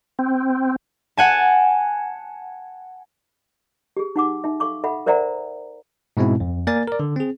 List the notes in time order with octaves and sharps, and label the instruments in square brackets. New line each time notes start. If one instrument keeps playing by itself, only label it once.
[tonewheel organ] C4
[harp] F#5 G#5 A5
[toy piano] G4 G#4
D#4 F#5 D6
D#4 E5
A4 F5 C#6 D6
A4 E5 F#5 B5
A#4 C5 D5 E5 F#5 A#5
[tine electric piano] G#2 B2 G#3 C4 E4
F2
A#3 A#4 D5 G#5 A6
A#4 D5
D3
C4 G#4